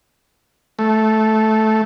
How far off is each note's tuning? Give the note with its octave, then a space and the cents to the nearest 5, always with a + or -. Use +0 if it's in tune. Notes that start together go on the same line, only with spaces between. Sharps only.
A3 -10